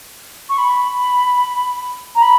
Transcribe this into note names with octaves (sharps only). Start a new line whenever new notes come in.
C#6
B5
A#5
B5